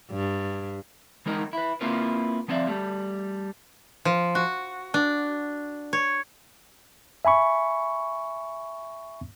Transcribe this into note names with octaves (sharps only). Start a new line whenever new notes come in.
G2
E3 G#3 D#4 A#4 D#5
E4 B4
A#3 C4 E4 F4 A#4 B4
F3 B3 C4 D5 E5 F5
G3 A3
F3
F#4
D4
C#5
E5 G#5 B5 C#6